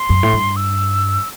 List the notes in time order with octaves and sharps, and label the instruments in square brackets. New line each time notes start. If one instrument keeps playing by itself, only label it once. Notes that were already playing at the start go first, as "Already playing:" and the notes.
Already playing: [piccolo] C6
[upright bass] F#2
A2
G2
[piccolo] E6